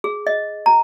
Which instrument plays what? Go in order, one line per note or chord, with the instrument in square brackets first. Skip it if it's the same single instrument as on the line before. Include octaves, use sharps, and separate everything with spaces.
[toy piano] G#4
D#5
A#5